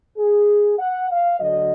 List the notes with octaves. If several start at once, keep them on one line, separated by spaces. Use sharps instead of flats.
G#4
F#5
F5
D2 D3 F#3 D#5